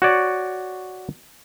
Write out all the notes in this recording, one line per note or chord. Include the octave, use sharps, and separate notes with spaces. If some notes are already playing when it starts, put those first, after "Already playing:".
F#4 C#5 D5